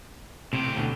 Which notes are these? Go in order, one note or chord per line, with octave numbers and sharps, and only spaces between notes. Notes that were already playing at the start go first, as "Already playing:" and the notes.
A2 C3 G4
D2 B2 D3